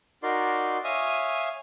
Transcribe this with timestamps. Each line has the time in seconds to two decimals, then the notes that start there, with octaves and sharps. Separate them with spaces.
0.23 D#4 F#4 A#4 D5 C6
0.84 C#5 E5 F5 G#5 D#6